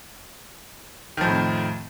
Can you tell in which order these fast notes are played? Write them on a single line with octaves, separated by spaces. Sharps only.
D#3 F3 A2 F2